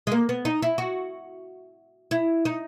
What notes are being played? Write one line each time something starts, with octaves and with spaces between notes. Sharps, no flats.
G#3
A#3
B3
D#4
E4
F#4
E4
D#4